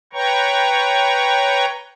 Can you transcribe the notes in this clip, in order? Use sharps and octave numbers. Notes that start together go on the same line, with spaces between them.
B4 C#5 G5 A#5 C#6